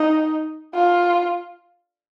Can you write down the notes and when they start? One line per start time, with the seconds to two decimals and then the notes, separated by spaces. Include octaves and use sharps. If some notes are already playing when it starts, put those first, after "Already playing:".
Already playing: D#4
0.74 F4